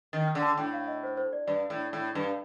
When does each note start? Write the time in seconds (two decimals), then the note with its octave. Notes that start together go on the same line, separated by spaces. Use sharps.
0.13 D#3 A6
0.27 F6
0.35 D3
0.42 A5
0.58 A2 G5
0.73 F5
0.88 D#5
1.03 C5
1.18 C5
1.33 D5
1.47 G2 D5
1.70 A2
1.93 A2
2.15 G2